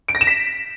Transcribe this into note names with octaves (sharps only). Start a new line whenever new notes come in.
D7
A#6
E7
B6